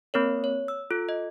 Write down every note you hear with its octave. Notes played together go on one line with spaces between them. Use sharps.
A#3 C4 A#4 C#5
C#5
E6
F4 A4
D#5